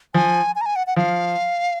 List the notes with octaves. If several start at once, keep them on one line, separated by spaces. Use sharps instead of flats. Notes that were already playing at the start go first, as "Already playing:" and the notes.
F3 G#5
G#5
A#5
G#5
F#5
F#5
F3 F5